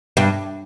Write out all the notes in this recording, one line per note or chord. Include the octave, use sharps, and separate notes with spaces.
G2